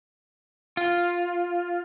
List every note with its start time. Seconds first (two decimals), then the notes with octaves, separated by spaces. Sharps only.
0.77 F4